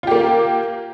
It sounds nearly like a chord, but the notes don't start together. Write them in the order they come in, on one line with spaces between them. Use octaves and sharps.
F4 G4 A#3